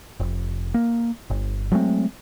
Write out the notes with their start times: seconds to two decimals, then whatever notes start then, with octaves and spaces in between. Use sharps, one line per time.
0.20 F1
0.74 A#3
1.30 G1
1.72 F#3 G#3 A3 C4